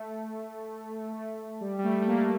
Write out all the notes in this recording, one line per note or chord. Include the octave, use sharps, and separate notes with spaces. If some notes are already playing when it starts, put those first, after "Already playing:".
Already playing: A3
A3
G3
G3
A3
A3
A#3